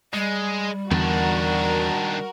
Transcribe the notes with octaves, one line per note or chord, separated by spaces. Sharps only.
G3 G#3
E2 D3 D#3 D4 F#4 A#4